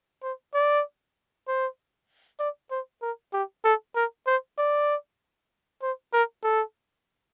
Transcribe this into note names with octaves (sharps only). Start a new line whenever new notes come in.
C5
D5
C5
D5
C5
A#4
G4
A4
A#4
C5
D5
C5
A#4
A4